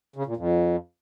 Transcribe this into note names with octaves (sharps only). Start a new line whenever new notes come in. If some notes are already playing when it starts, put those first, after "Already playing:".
C#3
A#2
F2